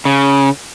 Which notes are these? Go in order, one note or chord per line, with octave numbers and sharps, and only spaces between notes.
C#3